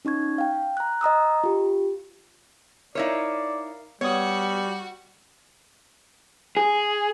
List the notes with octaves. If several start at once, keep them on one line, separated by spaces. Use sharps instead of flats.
C#4 D#4 C#6 G#6
F5 G5
A#5 F#6
D#5 A#5 D#6 E6
F4 G4
D#4 E4 A#4 C#5 D5 F5
G3 B3 F#4 C#5 D#6
G#4